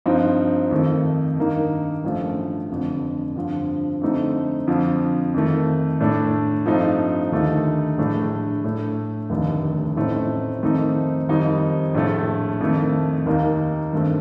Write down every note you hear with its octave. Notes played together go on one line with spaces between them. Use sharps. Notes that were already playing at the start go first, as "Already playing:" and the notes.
G2 F3 C4 D#4
F2 D#3 A3
G2 D#3 A#3 D#4
A1 G2 F3 A3
F1 F2 D3
G2 D3 F3 C4
F2 D3 A3 C4 D#4
F2 D3 F3
F2 D#3 A3
A2 A3 D4
G2 F3 A3 C4 D#4
D#2 D3 A3 D#4
A#1 A2 A3 D4
A2 A3 D4
F1 D#2 D3 A3 D#4
A1 A2 A3 C4 D#4
F2 D#3 A3 C4 D#4
F2 D#3 G3 C4 D#4
A#1 A2 A3
F2 D#3 A3
D#2 D#3 A#3 D#4
G2 D#3 A3 C4